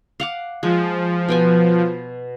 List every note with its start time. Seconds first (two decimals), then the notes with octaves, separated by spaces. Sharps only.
0.20 F5 F#5 D6
0.63 F3 G#3
1.28 B2 G5 G#5